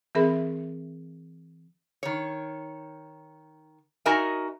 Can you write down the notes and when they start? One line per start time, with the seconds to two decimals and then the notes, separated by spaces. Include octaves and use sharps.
0.15 E3 C4 G#4 A#4 E5 B5
2.03 D#3 C#5
4.06 D#4 F#4 A#4 D#5 E5 G#5